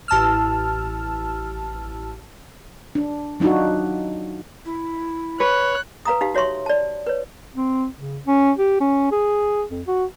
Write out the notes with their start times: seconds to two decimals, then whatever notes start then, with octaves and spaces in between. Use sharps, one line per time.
0.08 A1 A5 E6 F6
2.95 D4
3.40 F#3 D4 D#4 F4 F#4
4.65 E4
5.40 B4 C#5 F#6
6.05 B4 F5 A#5 D#6
6.21 D#4 G4 F5
6.35 F#4 C#5 E5 C6 C#6
6.66 D5 A5
7.07 B4 C#5
7.55 C4
7.98 C#3
8.27 C#4
8.58 G4
8.80 C#4
9.12 G#4
9.71 F2
9.87 F#4